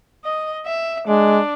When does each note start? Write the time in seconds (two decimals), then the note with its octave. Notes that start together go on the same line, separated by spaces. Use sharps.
0.25 D#5
0.66 E5
1.08 G#3 D4